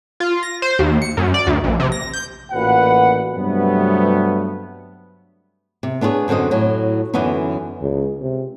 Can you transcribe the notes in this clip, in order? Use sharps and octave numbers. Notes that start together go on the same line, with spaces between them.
F4
A#6
C5
D#2
C#7
F#2
D5
D2
A#1
C3
A#6
G6
A1 A#2 F#4 B4 F#5
G2 C3 F#3 A3 B3
C3
B3 D4 G#4 B4 C#5
F#2 D3 C4 F#4 D#5
A2 F#3
F#2 D3 E3 B3 C#4 D#4
C#2
C3